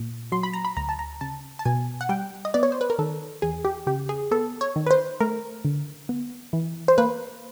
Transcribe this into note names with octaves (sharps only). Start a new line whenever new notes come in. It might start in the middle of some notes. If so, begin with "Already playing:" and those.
Already playing: A#2
F#3 C6
B5
A#5
B5
D2 A#5
A5
A#5
C#3 A5
A5
B2 G#5
F#5
G3 G5
D#5
B3 D5
C#5
C5
B4
A#4
D#3 A4
E2 G#4
G4
C#3 G4
G#4
B3 A4
C#5
D#3
B4
C5
A3 A#4
D3
B3
E3
C5
A#3 B4